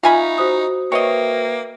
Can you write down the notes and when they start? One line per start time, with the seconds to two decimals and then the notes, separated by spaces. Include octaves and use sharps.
0.03 D#4 F4 E5 F5 G#5 B5 C#6
0.38 F#4 C5 D#6
0.92 A#3 B4 C#5 D#5 E5 G5